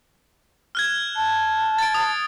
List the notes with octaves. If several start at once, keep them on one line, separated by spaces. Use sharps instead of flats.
F6 F#6 G#6
A5
A6 D7
D#6